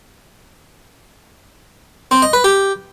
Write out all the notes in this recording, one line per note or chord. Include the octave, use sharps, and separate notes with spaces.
C4
D#5
B4
G4